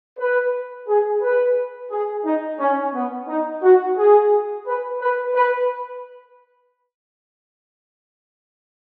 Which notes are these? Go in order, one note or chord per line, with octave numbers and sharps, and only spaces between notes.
B4
G#4
B4
G#4
D#4
C#4
B3
D#4
F#4
G#4
B4
B4
B4